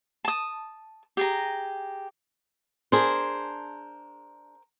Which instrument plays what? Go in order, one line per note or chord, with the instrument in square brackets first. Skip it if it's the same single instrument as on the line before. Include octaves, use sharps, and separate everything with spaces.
[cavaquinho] A5 D#6
G4 G#4 A#5
[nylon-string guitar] D4 G#4 [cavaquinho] A#4 C5